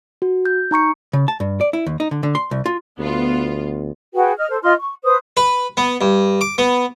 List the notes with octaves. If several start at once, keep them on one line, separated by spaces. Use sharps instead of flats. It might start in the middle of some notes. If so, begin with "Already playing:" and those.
F#4
G6
D#4 A#5 C#6 C#7
C#3
A5
G2
D5
E4
D#2
D#4
D3
D3
C6
C2
F4
D2 B3 F4
F#4 G#4 B4 G5
D#5 F6
A4 C5
F4 D#5 C6 F6
C#6
B4 C5 D#6
B4
B3
G2
D6
B3